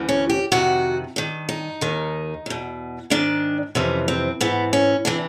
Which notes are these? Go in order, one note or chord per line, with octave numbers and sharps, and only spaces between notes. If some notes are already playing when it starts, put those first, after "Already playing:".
Already playing: D2 C#3 E3
C#4
G4
F2 C3 D#3 F#4
G2 D#3
D#4
D#2 D#3
E2 B2
G#2 D#3 D4
F2 C3 E3 C#4
C4
G#2 E3 B3
C#4
C3 E3 D4